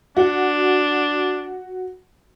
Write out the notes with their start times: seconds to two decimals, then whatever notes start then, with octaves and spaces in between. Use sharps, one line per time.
0.17 D4 F#4